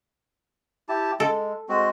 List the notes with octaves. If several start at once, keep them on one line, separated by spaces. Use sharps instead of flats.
E4 G4 A5
G#3 A4
G#3 C4 F#4